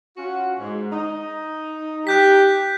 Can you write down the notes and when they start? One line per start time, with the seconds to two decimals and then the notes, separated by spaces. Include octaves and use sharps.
0.17 C#4 F4 F#4
0.58 G#2
0.91 D#4
2.07 G4 F#6 G6 B6